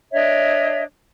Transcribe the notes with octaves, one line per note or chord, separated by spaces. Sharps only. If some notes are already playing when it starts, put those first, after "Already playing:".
D4 C#5 D#5 E5